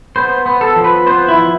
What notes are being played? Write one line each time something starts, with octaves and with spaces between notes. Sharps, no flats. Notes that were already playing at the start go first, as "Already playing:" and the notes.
B3 C5
B3
A4
F3
B4
B3 C5
E4
F3